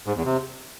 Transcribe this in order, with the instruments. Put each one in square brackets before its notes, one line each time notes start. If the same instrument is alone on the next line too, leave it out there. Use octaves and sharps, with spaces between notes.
[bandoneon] G#2
E2
C3